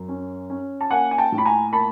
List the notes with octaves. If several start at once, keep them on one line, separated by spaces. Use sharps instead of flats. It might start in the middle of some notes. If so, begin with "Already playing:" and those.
Already playing: F#2
C#4
C#4
A5
A#3 F#5 G#5
G#5
G5 A5
A2
B5
G#5 A#5
A#3 A5 B5